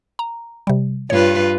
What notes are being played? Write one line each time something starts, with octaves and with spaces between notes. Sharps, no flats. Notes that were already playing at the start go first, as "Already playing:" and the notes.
A#5
C3 G3
G2 F4 B4 C#5